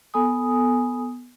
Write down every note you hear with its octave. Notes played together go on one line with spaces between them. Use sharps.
B3 A4 G#5 D#6